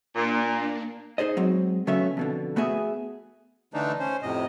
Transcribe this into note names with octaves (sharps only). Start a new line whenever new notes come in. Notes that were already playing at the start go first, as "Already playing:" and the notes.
A#2 A#3 D4
D#4 G#4 C5 D#5
F#3 G#3 C4
C#3 F#3 A3 B3 C#4 E5
F2 B2 D3
A3 B3 F#4 G#4 E5
D3 E3 A3 D4 D#4
C#4 C5
F2 A2 C3 D#5